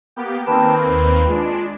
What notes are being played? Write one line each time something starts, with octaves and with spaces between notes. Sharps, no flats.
A#3 B3 G4
D#3 A#3 C4 B4 G5 A5
D#2
G#3 D4 F4